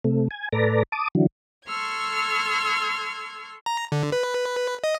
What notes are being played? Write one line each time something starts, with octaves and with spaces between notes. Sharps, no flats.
C3 A3
G#5
A2 A4 B4 D5 A#5
A5 D6 D#6
D3 E3 F#3
A4 C6 C#6 E6 F6 G#6
A#5
D3
B4
D#5